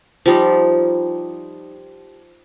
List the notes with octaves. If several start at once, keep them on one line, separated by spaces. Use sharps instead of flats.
F3 G3 D#4